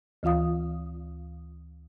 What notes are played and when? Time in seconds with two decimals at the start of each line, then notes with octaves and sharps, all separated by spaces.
0.23 D2 E3 F4 F5 D#6